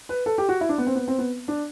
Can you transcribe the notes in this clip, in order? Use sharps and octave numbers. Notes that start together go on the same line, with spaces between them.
B4
A4
G4
F#4
E4
D4
B3
C4
B3
C4
B3
D4